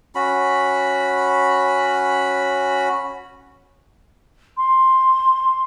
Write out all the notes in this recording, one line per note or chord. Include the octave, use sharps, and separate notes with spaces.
C#4 F#4 B5
C6